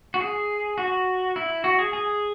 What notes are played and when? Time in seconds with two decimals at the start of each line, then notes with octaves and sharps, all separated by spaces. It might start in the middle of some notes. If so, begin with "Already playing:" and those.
0.14 F#4
0.21 G#4
0.78 F#4
1.36 E4
1.64 F#4
1.79 G#4
1.93 G#4